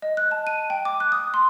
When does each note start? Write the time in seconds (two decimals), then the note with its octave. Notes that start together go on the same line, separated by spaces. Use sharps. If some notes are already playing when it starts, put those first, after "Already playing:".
0.02 D#5
0.17 F#6
0.31 A5
0.47 D#7
0.70 G5
0.85 D6
1.00 F#6
1.12 D#6
1.34 C6